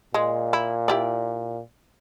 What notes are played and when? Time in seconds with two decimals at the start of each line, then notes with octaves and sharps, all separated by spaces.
0.14 A#2 G#3
0.53 E4
0.88 E4 G4 D5